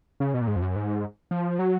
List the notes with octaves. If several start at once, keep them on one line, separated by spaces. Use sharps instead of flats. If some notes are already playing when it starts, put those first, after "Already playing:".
C#3
B2
A#2
G#2
F2
F#2
G#2
F3
F#3